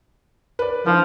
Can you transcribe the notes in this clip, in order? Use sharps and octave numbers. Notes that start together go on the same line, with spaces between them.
B4 D5
D3 E3 F3 F5